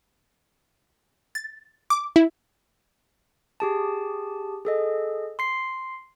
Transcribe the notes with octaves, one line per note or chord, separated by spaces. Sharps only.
A6
D6
E4
G4 G#4 A5
G#4 A4 D#5
C6 C7